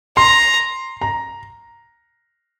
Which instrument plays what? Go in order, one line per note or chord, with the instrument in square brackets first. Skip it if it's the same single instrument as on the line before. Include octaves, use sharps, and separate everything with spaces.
[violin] A#5 [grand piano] C6
[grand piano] A#5